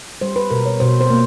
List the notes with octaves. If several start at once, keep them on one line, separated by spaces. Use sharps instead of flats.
G3 C5
B4
B2 A#4
C#5
B2 C5
C5
A#3